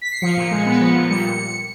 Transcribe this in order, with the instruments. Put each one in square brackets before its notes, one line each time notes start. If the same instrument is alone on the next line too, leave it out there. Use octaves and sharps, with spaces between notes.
[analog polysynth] B6
C7
F3 C#7
A#2
G#3
B3
F3
A#2
G3 C#7